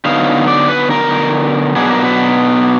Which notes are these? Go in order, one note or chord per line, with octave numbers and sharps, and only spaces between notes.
D3 F#3 B3 D#4 F5
D5
B4
A#4
B2 F#3 B3 D4 G#4
A#4
B4